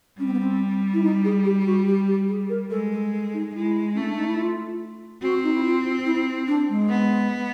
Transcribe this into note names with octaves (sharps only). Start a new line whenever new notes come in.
G3 C#4
C4
B3
C4
E4
D#4
G#4
G4
G4
F#4
G4
G4
G#4
A#4
G#3 A4
A4
A4
D#4
G#3 E4
A3 C#4
D4
D#4
E4
F4
C4 F#4
D#4
E4
F4
E4
D4
G#3
B3